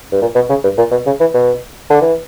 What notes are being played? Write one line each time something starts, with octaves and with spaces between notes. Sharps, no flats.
G2
A#2
B2
C#3
G2
A#2
B2
C#3
E3
B2
D3
E3